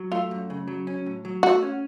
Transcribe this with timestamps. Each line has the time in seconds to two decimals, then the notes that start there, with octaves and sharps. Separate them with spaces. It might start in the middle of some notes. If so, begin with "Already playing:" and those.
Already playing: F#3
0.12 A3 F4
0.31 F#2
0.50 C#3
0.68 F#3
0.87 C#4
1.06 A2
1.25 F#3
1.43 A3 F#4
1.63 C#4